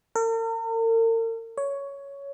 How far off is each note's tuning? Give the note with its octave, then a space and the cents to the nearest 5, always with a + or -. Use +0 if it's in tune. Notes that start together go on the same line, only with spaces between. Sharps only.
A#4 -45
C#5 +10